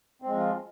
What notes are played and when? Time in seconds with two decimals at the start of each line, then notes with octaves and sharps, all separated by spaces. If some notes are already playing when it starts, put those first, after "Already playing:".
0.22 C4
0.26 G#3
0.31 F3
0.35 F4